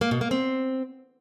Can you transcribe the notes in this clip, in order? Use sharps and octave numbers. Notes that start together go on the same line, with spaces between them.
A#3
B2
A#3
C4